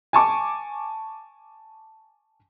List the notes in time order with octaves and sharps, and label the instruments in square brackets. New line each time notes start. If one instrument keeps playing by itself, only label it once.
[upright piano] G#5 A5 C#6 D6